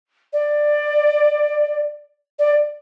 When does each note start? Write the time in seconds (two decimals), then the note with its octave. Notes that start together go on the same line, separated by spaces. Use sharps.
0.33 D5
2.39 D5